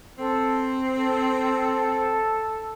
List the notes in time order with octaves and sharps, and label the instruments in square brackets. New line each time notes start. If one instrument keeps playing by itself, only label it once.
[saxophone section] C4 [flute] A4
[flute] A4